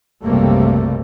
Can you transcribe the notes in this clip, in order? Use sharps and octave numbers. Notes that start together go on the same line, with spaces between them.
F#1 B1 C3 G3 A3 A#3